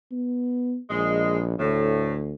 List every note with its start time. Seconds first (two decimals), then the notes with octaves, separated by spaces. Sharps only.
0.11 B3
0.90 A#1 G#3
1.60 D2 A2